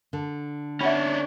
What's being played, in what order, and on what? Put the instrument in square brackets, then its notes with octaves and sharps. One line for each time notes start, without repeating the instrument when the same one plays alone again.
[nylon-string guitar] D3
[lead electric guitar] C#4 D4 [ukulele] E5 F#5 B5